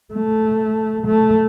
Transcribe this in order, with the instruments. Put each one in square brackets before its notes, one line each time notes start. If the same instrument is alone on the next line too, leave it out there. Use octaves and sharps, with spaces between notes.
[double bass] A3
A3